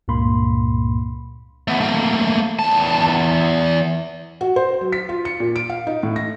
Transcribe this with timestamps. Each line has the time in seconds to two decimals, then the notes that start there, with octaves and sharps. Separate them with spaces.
0.08 C#2 G2 A#2 A#3 B5 C6
1.68 A3 B3
1.80 A3 A#3
2.59 E2 A5
4.41 F#4
4.56 C5
4.81 F#3
4.92 B6
5.09 F4
5.25 C#7
5.40 A#2
5.56 D7
5.69 F5
5.87 D#4
6.03 A2
6.16 A#6